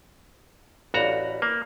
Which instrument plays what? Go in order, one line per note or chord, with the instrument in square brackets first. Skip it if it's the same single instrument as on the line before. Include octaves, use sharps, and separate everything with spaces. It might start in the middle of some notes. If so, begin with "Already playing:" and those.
[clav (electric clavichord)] A1 F#4 A#5 [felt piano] D5 F5 B5
[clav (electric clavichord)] A#3